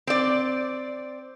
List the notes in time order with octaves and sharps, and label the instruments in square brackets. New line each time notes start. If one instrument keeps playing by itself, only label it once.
[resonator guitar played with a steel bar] C4 D5